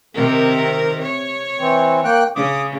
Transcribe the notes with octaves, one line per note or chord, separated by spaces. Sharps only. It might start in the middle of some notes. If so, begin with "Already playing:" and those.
C3 D#3 C4 A#4
C#5
E3 C4
A#3 G5 F#6
C#3 D6 D#6